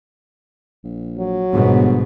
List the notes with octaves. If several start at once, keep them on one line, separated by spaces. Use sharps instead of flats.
A#1
F#3
G1 G#2 B2